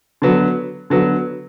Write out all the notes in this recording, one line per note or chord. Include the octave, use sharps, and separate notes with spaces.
D3 F#3 B3
D3 F#3 B3